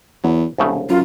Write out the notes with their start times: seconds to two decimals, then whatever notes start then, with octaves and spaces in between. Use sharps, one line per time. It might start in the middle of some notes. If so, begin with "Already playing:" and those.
0.24 E2 F#3
0.58 E1 C2 C#3 A3
0.89 F#2 F4